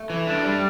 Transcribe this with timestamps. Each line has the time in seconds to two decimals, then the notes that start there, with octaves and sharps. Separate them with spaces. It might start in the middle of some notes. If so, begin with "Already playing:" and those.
Already playing: A3
0.10 E3
0.27 D4
0.45 G3